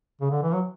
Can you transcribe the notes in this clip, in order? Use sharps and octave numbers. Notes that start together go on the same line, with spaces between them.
C#3
D3
E3
F#3